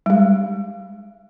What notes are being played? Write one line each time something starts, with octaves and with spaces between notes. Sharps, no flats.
G3 G#3